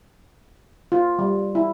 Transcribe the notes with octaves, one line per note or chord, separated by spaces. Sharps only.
F4
G3
E4